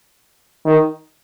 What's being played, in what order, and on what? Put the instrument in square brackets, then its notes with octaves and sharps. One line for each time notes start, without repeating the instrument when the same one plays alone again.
[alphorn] D#3